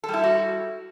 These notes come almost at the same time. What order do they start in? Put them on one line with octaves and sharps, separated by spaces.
A4 G3 E4 G4 F#4